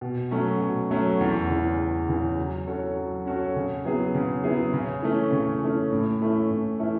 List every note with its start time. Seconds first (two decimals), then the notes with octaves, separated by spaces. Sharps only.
0.01 B2
0.31 F#3 A3 C#4
0.61 B2
0.91 F#3 A3 C#4
1.20 E2
1.50 C#3 E3
1.79 E2
2.09 C#3 E3
2.38 F#3
2.67 C#4 F#4 A4 C#5
2.96 F#3
3.26 C#4 F#4 A4 C#5
3.56 C#3
3.85 F#3 B3 E4 G#4
4.15 C#3
4.44 F#3 B3 E4 G#4
4.73 C#3
5.02 E3 A3 C#4
5.32 C#3
5.62 E3 A3 C#4
5.91 A2
6.21 E3 A3 C#4 E4
6.51 A2
6.80 E3 A3 C#4 E4